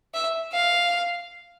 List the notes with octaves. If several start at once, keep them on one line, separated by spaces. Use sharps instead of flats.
E5
F5